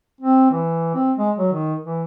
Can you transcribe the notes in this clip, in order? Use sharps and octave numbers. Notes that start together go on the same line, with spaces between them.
C4
E3
C4
G#3
F#3
D#3
E3